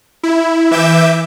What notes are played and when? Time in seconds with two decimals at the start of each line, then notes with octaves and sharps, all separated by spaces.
0.23 E4
0.71 E3 E5 D6 G6 E7